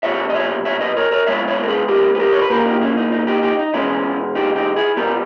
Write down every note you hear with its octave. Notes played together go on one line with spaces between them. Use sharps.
B1 A#2 G3 B3 C#5 E5
D#5
C#5 E5
C#5 E5
B4 D#5
A#4 C#5
A#4 C#5
A#2 G#3 B3 C#5 E5
C#5 E5
A#4
G#4 B4
G4 A#4
B4
G4 A#4
C#5
B4
C#2 B2 A#3 G4 A#4
D#4 G4
C#4 E4
D#4
D#4
D#4 G4
D#4 G4
D#4
E2 B2 G#3 B3 C#4 E4
D#4 G4
D#4 G4
E4 G#4
A#2 G3 B3 G4 A#4